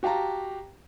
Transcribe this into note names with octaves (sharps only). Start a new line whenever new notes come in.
F#4 G4 F5 A5 A#5